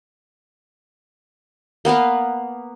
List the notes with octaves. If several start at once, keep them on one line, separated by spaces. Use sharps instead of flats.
A#3 B3 B4 F5